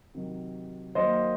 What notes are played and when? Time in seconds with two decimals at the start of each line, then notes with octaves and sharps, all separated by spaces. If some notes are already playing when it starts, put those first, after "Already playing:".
0.15 C3 D#3 F#3
0.95 D#3 F#3 A#3 C5 D#5